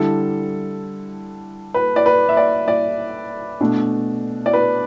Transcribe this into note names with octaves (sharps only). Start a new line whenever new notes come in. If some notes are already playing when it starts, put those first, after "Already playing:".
Already playing: D3 G3 E4 A4
B4
D5
B4
E5
D5
D5
B2 A3 D4
D5
B4